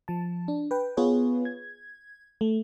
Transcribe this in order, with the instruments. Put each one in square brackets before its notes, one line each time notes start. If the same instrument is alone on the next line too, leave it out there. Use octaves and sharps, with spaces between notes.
[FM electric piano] F3 A5
D4
B4 G5
B3 F4 G#4 B4 C#5
G#6
A3